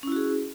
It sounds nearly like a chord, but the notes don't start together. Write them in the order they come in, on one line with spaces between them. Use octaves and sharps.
C#4 E4 F#4 G#4